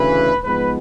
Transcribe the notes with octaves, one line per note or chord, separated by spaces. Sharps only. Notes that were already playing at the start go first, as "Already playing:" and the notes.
Already playing: D2 C#3 E3 B4
G#2 F3 G#3 B3 B4